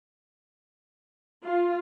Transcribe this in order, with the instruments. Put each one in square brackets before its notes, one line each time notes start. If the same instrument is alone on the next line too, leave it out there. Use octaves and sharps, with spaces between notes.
[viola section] F4